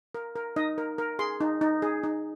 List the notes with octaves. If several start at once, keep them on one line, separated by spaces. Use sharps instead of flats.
A#4
A#4
D#4 D#5
A#4
A#4
G#4 C6
D#4
D#4
G#4
D#4